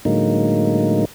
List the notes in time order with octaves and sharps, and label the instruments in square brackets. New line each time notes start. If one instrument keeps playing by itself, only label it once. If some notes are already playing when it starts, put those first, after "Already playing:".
[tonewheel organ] A2 D3 F#3 G#3 A#3 D#4